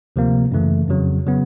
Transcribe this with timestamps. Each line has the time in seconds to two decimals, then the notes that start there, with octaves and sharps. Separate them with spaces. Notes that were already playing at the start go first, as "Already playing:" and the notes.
0.16 D2 C3 F3 A#3
0.52 F#2 C#3 E3 A3
0.88 F2 C#3 F#3
1.26 C#3 F#3 B3